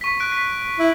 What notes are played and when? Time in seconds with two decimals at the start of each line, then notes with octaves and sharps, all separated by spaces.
0.01 C#6 B6
0.20 F#6 D7
0.32 B6
0.79 E4